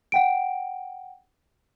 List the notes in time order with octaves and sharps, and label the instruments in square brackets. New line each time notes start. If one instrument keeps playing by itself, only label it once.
[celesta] F#5 G5 D7